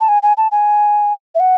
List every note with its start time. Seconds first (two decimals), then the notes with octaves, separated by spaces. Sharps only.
0.01 A5
0.08 G#5
0.23 G#5
0.37 A5
0.51 G#5
1.35 E5
1.40 F#5